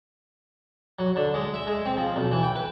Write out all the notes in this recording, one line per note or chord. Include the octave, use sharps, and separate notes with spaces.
F#3
D3
G#3
E5
G#3
C4
F3
B1
E3
G5
B4